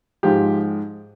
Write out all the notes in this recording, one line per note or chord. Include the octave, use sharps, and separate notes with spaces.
G#2 F3 G#3 G4